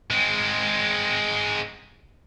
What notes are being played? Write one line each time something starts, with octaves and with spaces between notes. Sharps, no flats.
G#3 C4